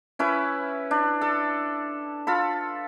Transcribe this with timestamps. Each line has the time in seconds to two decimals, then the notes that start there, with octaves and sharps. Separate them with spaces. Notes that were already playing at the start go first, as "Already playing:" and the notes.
0.19 C#4 E4 B4
0.91 D4
1.21 A4
2.27 F4 A4 B5